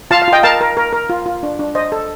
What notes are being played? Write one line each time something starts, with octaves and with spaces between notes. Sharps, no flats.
F4 F5 A5
F5
F4 D#5 G5
A#4 F5 A5
A#4
A#4
A#4
F4
F4
D4
D4
C5 D#5
A4